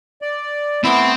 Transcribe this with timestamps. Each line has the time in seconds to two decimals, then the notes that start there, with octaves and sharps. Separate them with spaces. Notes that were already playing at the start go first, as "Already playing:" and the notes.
0.22 D5
0.84 A3 B3 C4 E4